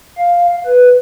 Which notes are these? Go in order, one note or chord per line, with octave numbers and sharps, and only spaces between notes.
F5
B4